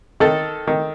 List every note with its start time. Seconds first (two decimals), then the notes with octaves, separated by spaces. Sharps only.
0.20 D#3 A4
0.67 D#3